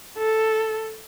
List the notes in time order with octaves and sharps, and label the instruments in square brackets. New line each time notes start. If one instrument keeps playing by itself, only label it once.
[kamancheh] A4